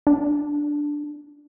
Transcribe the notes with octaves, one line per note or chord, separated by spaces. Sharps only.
D4